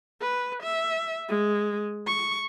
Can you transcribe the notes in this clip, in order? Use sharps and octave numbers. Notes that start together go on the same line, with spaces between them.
B4
E5
G#3
C#6